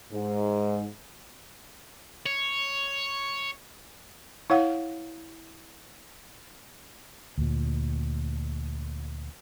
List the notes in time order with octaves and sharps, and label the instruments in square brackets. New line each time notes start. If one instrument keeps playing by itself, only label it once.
[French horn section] G#2
[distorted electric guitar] C#5
[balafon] E4 C#5 F5 F#5
[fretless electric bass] D2 A#2